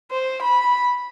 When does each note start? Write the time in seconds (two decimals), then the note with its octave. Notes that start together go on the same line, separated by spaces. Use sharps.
0.11 C5
0.42 B5